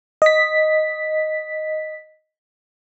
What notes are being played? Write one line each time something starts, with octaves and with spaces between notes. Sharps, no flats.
D#5 B6